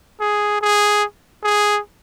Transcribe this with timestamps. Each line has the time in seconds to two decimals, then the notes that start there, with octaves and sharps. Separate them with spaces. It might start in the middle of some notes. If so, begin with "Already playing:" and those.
0.20 G#4
0.61 G#4
1.44 G#4